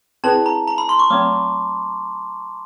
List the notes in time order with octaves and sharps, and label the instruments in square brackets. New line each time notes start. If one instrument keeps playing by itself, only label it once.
[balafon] C4 E4 G#4 B4 D5 [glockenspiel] A5
[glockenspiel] A#5
A#5
B5
C6
C#6
[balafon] F#3 A3 C4 [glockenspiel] D6